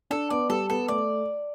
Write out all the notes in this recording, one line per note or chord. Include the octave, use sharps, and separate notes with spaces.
D4 A4
B3 D5
G3 A4
B3 A4
A3 D5